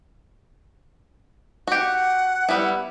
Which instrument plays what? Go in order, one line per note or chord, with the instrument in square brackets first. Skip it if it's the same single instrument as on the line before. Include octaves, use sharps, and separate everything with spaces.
[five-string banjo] F#4 G4 [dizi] F#5
[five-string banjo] G3 B3 E4